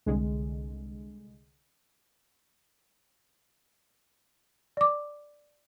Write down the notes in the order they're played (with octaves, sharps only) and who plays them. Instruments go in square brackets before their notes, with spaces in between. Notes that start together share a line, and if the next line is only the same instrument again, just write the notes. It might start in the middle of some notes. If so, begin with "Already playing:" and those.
[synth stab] C2 D3 G#3
[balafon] D5 D6